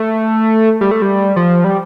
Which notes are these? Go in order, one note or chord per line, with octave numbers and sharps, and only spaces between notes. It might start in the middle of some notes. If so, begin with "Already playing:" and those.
Already playing: A3
G3
A3
G3
F3
G3